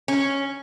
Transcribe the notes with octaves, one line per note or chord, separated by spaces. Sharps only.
C#4